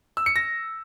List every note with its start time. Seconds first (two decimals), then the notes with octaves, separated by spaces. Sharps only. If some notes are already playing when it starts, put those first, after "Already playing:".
0.17 E6
0.26 C#7
0.36 A#6